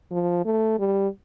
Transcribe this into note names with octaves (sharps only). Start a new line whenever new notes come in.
F3
A3
G3